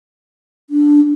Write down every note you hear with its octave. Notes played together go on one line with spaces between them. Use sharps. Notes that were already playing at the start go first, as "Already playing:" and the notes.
D4